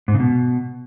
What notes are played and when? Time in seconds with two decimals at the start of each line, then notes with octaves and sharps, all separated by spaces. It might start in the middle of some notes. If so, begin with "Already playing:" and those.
0.08 G#2
0.14 C#3
0.20 B2